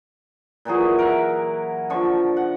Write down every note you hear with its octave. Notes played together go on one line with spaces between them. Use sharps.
A#2 E3 F#3 G#4
A#4 E5 F#5
D3 F3 C#6
F#5